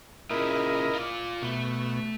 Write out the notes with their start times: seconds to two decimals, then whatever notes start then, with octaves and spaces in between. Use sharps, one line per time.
0.30 A#2 C#3 E4 A#4 D#5
0.95 F4 D5
1.42 B2 A3